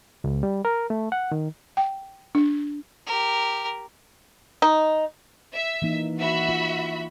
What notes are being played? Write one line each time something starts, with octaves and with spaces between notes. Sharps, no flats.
C#2
G3
A#4
A3
F#5
D#3
G5
D4
G4 A#4
D#4
E5
E3 A#3 D#4
F#4 E5 B5
F4